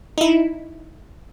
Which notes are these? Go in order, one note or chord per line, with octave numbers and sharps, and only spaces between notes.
D#4 E4